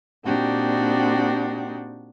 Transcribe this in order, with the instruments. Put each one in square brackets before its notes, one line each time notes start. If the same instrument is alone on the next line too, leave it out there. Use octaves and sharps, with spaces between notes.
[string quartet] A#2 C4 D4 D#4 F#4 G4